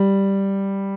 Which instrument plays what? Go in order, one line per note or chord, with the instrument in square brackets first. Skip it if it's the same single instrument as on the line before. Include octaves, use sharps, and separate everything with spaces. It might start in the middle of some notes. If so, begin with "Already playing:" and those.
Already playing: [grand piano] G3